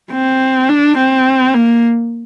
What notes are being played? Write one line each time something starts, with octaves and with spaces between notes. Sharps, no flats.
C4
D4
C4
A#3